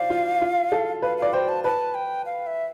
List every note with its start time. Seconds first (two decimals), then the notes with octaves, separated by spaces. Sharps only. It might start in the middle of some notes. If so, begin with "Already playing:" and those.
Already playing: C5 D5 F5
0.10 F4
0.41 F4
0.72 A4
1.02 B4 F5
1.17 D5 F5
1.33 C5 G5
1.49 A5
1.64 B4 A5
1.94 G5
2.26 F5
2.47 E5